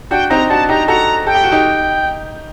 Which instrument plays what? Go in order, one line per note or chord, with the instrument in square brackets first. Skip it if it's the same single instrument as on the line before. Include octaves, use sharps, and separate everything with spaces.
[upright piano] D4 F#4 [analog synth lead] G5
[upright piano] C4 D#4 [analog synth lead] A#5
[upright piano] D4 F#4 [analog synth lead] A5
[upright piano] D#4 G4 [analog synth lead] A#5
[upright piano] F#4 A4 [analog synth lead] A#5
[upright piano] A4 [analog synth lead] G5
[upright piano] G4
F#4
D#4 G4